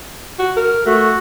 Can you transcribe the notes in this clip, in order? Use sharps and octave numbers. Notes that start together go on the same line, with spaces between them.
F#4
A#4
A3 F#4